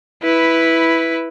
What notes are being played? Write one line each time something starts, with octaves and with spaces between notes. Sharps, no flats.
E4 B4